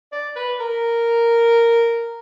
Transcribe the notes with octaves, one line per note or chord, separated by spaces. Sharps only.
D5
B4
A#4